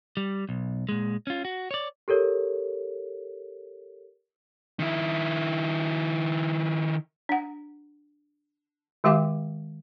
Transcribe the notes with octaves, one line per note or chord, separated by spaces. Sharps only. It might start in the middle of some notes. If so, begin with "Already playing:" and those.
G3
B1
A#2 G#3
C#4 F4
F#4
C#5 D5
G4 A4 A#4 C#5
D#3 E4
D4 F#5
D#3 G#3 G4 F5 G5 D6